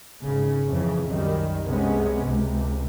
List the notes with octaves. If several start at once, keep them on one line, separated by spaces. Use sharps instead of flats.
G#1 C#3
F2 C#3 E3
C2 F#2 D#3 G3
C2 G2 C3 G#3 B3 C#4
C#2 C3